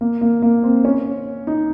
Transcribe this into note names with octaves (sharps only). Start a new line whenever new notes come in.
A#3
A#3
A#3
C4
C#4
D#4